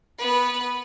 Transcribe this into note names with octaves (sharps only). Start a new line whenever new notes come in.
B3 B4